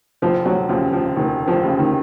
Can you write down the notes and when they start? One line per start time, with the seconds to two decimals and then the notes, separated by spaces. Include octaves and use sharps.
0.22 F1 F3
0.45 F#3
0.69 D#2 C#3 F3
0.93 F3
1.16 F1 D#3
1.48 F3
1.63 D#2 C#3
1.79 D#3